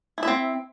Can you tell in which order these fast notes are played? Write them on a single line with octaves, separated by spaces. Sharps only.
E4 E5 C4